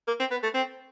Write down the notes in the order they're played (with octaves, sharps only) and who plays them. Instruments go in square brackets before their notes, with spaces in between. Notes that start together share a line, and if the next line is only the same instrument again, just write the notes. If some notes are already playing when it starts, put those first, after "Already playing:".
[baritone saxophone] A#3
C4
B3
A3
C4